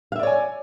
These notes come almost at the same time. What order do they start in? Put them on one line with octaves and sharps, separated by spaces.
F5 E5 D5 C#5 G#5